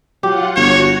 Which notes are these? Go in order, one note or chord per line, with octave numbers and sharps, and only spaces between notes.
F#3 F4 G4 F#5
G1 F#4 C#5